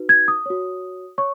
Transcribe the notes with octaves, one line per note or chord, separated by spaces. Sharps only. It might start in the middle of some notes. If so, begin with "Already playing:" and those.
Already playing: D#4 F#4 B4
G#6
D#6
F#4 C#5
C#5 C#6